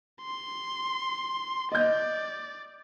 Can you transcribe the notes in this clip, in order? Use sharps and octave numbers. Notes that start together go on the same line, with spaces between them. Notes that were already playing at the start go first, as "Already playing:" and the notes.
C6
D5 D#5 G6